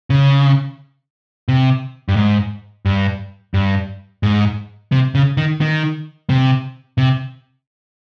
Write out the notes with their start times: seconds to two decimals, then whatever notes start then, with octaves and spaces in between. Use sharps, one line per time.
0.10 C#3
1.48 C3
2.09 G2
2.16 G#2
2.85 G2
3.54 G2
4.23 G#2
4.92 C3
5.15 C#3
5.37 D#3
5.61 D#3
6.29 C3
6.98 C3